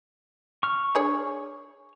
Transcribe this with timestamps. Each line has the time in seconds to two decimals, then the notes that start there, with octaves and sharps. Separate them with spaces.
0.63 C#6 F6
0.95 D4 G#4 C#5